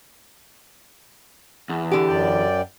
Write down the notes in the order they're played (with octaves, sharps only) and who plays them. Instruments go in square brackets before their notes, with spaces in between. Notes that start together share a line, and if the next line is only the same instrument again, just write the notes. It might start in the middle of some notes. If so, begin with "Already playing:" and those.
[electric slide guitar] E2
[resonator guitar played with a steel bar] D3 G4
[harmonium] F#2 D5 G5